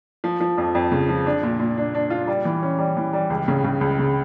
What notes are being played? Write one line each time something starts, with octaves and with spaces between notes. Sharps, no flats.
F3
F3
F2
F2
C#3
F3
D4
A#2
A#2
D4
D4
F4
G3
E3
C#4
G3
E3
G3
C#2
C#3
C#3
C#2
C#3